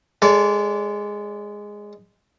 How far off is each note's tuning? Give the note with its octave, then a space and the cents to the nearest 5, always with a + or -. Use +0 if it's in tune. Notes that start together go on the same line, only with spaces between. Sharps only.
G#3 -5 A4 +0 D5 -35